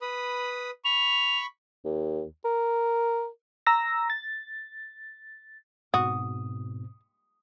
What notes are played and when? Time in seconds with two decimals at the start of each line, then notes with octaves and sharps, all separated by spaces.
0.02 B4 B5 D#6
0.85 B5 C#6 F7
1.85 D#2
2.45 A#4
3.66 A#5 E6 A#6
4.10 A6
5.94 G#2 B2 C4 F#4 D#6